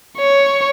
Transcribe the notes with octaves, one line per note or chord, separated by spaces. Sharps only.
C#5